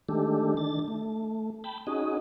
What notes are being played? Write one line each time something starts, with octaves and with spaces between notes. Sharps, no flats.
D#3 G#3 A3 D4 G4 A4
D#3 D4 A6
A3
G5 A5 B5
C#4 D#4 F#4 G#4 D#5